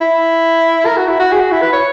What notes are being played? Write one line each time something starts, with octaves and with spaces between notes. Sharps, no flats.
E4
A#4
F#4
E4
F#4
G#4
F#4
E4
B4
C#5